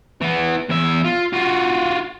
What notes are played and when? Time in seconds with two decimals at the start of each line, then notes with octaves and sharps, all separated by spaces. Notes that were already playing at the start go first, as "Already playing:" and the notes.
0.22 E3 B3
0.69 E2 E5
1.04 F4
1.33 F4 F#4